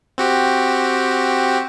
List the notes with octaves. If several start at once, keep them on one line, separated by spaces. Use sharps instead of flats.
C4 F#4 G4